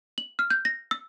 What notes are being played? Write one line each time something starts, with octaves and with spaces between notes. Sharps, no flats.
F#7
F6
G6
A#6
E6